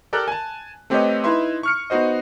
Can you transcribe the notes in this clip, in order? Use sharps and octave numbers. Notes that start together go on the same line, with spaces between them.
G4 A4 A#4 D5 A#5 F#6
G#5 A5
A3 C4 G4 B4 C#5 D#5
D#4 E4 B4 E5 C6
C#6 F6 C#7
B3 D#4 F#4 C5 D#5